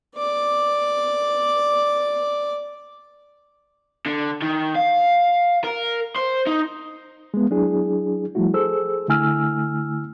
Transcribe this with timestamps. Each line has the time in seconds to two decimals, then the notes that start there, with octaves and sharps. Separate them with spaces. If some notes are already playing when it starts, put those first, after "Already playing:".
0.16 D5 D6
4.06 D3
4.42 D#3
4.75 F5
5.64 A#4
6.16 C5
6.47 D#4
7.34 G#3 B3
7.50 F#3 D4 E4 G#4
8.35 F3 G3 A3 E4 F#4
8.54 G#4 A4 C5 E6
9.08 D3 A3 E4 G#5 E6 F6